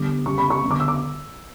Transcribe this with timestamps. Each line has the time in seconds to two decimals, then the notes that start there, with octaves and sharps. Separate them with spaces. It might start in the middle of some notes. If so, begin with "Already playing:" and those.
Already playing: D3 G3 B3 D6
0.26 C#3 G3 B3 C#6
0.38 B5
0.50 C#6
0.62 D3 G3 B3
0.71 D6
0.80 E6
0.88 D6